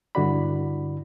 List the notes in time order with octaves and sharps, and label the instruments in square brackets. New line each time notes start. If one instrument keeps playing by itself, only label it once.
[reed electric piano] G2 D3 E4 F#4 D5 B5